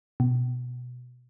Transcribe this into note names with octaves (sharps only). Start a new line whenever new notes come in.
B2